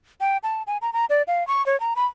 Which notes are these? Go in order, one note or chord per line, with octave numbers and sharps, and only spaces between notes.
G5
A5
G#5
A#5
A#5
D5
F5
C#6
C#5
A#5
B5